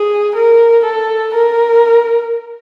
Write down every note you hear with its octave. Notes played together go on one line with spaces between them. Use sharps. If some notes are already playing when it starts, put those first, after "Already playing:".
Already playing: G#4
A#4
A4
A#4